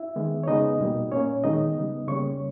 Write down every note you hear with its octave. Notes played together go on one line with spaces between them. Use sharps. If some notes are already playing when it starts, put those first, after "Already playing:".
Already playing: E4 E5
D#3 G#3 B3
C#5
C#3 G#3 B3 D#4 D#5
B2 G3 A#3
A#2 A#3 C#4 C#5
D#3 G#3 B3 D#4 D#5
C#3 G3 B3
C#3 G3 A#3 C#5 C#6